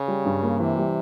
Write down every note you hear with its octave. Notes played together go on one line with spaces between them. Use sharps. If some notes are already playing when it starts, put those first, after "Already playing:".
Already playing: C#3
G3
G2
A#3
C3 E3
G3